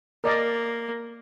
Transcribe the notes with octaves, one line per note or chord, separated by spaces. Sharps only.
A#3 A#4 D5 D#5